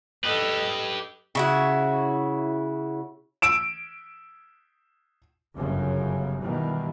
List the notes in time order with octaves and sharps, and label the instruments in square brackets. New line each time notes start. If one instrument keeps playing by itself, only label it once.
[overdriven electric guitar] G4 B4 [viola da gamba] A4 D#5
[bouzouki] C#3 E4 F#4
[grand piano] E6 D7 E7
[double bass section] G1 F#2 C#3
B2 D#3 E3 G3